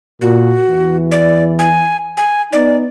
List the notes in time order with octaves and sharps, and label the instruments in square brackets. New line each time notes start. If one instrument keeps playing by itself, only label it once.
[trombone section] A#2 [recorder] F#4
[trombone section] E2 E3
[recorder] D5
G#5
G#5
[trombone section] B3 D#4 [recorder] D5